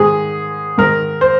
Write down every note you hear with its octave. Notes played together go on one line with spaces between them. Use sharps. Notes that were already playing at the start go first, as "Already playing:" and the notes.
Already playing: G#2 D#3 G#4
G#2 D#3 A#4
C5